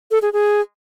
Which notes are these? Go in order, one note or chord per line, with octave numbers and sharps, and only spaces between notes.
A4
G#4
G#4